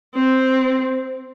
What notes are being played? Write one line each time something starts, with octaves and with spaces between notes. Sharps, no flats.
C4